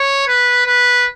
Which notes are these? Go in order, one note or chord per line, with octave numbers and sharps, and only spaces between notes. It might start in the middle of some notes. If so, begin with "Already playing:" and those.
Already playing: C#5
B4
B4